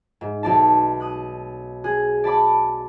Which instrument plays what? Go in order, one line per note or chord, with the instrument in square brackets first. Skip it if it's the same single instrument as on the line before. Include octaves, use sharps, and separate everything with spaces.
[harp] G#2
B1 D5 A5
D#6 F#6
G#4 F#6
D5 A5 B5 D6